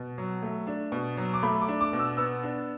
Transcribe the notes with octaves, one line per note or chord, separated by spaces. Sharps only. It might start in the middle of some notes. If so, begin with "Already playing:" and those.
Already playing: B2
F#3
A3
D4
B2
F#3
D6
A3 B5
D6
D4
D6
B2
E6
B3 E6
D4